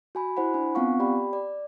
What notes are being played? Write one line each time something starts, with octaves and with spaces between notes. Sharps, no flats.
F#4 G#5 B5
E4 C5 F#5 B5
D4 G#5
B3 C4 F4 F5 F#5 C#6
G4 D5 G5 B5
D5